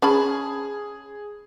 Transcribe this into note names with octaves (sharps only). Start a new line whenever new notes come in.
C#4 G#4 A5 B5